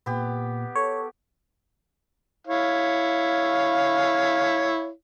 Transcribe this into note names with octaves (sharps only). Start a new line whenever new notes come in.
A#2 B3 G4
A4 C#5
E4 C#5 F5